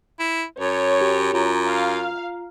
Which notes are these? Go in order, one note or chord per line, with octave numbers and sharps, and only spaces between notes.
E4
F#2 C#5
G4
F#2 F4 A#5
F5